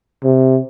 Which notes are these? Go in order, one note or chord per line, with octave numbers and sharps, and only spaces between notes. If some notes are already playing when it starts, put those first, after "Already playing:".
C3